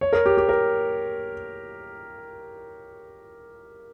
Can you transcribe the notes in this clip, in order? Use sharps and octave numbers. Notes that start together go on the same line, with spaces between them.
C#5
A#4
G4
G4
A#4